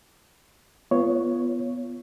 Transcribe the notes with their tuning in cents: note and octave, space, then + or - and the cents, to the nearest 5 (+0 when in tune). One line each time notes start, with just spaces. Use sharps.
B3 +0 F4 -20 C#5 +5